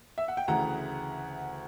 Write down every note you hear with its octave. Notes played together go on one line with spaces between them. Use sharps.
E5
F#5
G5
D2 C#3 E3 F#5 A#5